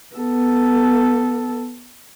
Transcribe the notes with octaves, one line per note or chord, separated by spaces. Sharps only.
B3 A4